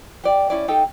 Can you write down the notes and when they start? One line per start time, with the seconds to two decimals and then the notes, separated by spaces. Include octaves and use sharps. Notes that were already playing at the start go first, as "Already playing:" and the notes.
0.24 G4 D5
0.50 C#4 E4 D5
0.68 D#4 G4 A4 G5